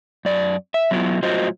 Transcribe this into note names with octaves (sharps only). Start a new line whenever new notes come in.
F#2 D5
E5
F#3 B3 C#4 E4 F4
A2 F#3 F4 F#4 C5 D#5